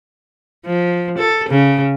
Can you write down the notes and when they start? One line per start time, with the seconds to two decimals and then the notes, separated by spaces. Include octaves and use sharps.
0.66 F3
1.18 A4
1.49 C#3